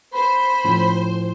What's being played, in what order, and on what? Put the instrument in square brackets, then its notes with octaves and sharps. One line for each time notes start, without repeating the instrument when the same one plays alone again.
[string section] C5 [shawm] B5
[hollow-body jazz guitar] A2 F3 C#4